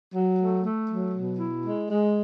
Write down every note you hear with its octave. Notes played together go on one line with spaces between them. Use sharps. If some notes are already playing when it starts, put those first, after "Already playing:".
F#3
A3
A3
F#3
B2
E4
G#3
G#3